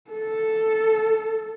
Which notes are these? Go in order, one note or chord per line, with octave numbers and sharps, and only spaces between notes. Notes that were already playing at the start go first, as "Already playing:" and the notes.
A4